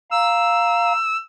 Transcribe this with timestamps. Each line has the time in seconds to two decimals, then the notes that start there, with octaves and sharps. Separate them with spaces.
0.11 F5 A#5 E6